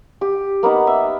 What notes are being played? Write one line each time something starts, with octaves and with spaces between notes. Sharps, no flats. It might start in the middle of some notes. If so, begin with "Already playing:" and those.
G4
A#3 B3 D#4 F#5
E5